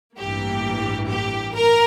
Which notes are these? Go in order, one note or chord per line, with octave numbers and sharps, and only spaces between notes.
A1 G2 E3 A#3 G4
G4
A#4